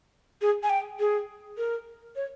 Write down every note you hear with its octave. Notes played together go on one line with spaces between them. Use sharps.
G#4
G#5
G5
G#4
A#4
C#5